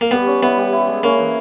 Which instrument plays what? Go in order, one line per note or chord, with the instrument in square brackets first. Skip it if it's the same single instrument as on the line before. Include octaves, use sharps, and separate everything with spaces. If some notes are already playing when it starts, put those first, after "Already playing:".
[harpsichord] A#3
[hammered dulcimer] G3 [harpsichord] B3
[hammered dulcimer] C#4
[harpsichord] B3 [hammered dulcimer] E4
[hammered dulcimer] G3
E4
G#3
[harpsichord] A#3 [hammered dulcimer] C#4
[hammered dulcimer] E3